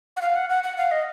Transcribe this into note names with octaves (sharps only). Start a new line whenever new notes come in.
F#5
F5
F#5
F#5
F#5
F5
D#5